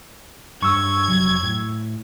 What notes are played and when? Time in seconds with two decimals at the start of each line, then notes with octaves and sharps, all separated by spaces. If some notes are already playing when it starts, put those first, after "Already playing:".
0.62 G2 C#6 E6 G#6
1.08 F1 F#3
1.42 A2